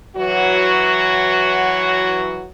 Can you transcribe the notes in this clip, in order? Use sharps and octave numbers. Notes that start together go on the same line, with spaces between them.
E3 F#3 F#4